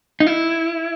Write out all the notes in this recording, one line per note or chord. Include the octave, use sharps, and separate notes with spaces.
D#4
E4